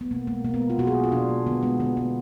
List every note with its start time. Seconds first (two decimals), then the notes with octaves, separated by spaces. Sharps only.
0.01 B3
0.11 B2 A#3
0.27 G#3 A#3
0.44 B2 A#3
0.54 B3
0.61 G#3
0.70 F4
0.78 B2 F#4
0.87 G#4
0.95 A#3
1.04 F4
1.12 B2 D4
1.30 A#3
1.46 D3 B3
1.63 G#3 B3
1.80 D3 B3
1.97 G#3 B3